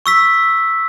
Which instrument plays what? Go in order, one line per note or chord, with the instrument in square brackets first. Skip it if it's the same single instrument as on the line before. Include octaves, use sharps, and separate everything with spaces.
[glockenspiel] C#6 E6 B6